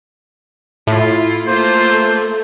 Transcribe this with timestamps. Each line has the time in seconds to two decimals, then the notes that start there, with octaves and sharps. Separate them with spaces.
0.87 A2 E4 F4
1.47 A3 A#3 F4 C5